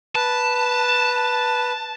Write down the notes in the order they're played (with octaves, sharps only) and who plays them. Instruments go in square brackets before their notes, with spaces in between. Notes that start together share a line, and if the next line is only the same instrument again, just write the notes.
[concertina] B4 [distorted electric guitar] A5